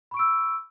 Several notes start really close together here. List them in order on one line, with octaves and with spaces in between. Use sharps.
B5 C#6 D7 E6